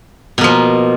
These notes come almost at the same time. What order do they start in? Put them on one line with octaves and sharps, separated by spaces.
B2 A#3 F3